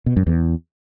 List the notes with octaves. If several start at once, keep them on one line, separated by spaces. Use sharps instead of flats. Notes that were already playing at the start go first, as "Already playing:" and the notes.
B2
F#2
E2